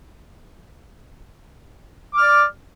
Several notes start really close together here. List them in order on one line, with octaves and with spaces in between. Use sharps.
D6 F6 D5